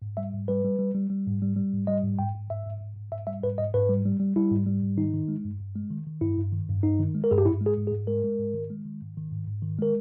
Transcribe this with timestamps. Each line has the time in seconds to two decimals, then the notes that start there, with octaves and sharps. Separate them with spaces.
0.02 G#2
0.17 G3 E5
0.33 G#2
0.48 G3 B4
0.64 G3
0.79 G3
0.95 G3
1.10 G3
1.26 G#2
1.42 G3
1.56 G3
1.73 G#2
1.87 G3 D#5
2.03 G#2
2.18 G#2 G5
2.35 G#2
2.50 G#2 E5
2.66 G#2
2.80 G#2
2.96 G#2
3.12 G#2 E5
3.27 G3 E5
3.43 G#2 B4
3.58 G#2 D#5
3.74 G#2 B4
3.89 G3
4.05 G3
4.20 G3
4.36 G3 E4
4.51 G#2
4.66 G3
4.83 G#2
4.97 D#3 D#4
5.14 D#3
5.28 G#3
5.45 G2
5.60 G2
5.75 G#3
5.91 D#3
6.06 D#3
6.21 G2 E4
6.38 G2
6.52 D#3
6.69 G2
6.83 G2 D#4
6.99 D#3
7.15 G#3
7.24 A#4
7.31 G2 G#4
7.38 G4
7.45 G#2 E4
7.61 G#3
7.66 G#4
7.77 G#2
7.87 G#4
7.92 G#2
8.07 G#3 A#4
8.24 G#3
8.39 G#2
8.54 D#3
8.70 G#3
8.85 D#3
9.01 G#2
9.17 D#3
9.32 G#2
9.47 G#2
9.62 D#3
9.79 G#3 A#4